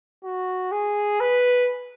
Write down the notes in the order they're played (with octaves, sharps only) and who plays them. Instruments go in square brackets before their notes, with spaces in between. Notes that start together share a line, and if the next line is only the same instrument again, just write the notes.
[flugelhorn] F#4
G#4
B4